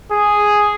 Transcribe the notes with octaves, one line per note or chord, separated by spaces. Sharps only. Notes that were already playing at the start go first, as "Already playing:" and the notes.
G#4